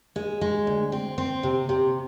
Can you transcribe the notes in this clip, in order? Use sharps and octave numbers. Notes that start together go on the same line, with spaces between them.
G#3
G#3
D2
C4
C4
C3
C3